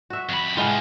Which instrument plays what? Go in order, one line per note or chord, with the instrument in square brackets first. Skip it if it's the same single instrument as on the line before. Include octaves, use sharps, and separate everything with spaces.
[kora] F#4 E5
[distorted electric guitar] F2 B5
[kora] A2 G#3 B3 [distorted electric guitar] C#4 F4